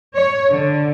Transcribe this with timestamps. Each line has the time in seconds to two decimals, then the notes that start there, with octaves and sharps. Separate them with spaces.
0.14 C#5
0.51 D3